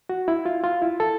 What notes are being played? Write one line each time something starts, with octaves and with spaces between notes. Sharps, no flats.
F#4
E4
F4
F4
E4
A4